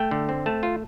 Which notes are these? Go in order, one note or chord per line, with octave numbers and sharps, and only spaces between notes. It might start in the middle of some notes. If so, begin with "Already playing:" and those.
Already playing: A3 G5
D3
C4
A3 A5
F4